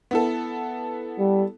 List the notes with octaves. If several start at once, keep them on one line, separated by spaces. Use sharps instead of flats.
B3 E4 A4
G3